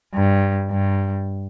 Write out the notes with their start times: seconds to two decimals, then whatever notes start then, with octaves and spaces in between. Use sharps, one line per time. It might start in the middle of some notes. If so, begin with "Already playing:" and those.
0.14 G2
0.71 G2